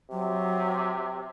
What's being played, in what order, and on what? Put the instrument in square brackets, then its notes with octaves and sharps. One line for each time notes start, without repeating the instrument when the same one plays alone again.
[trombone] C3 [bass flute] F#3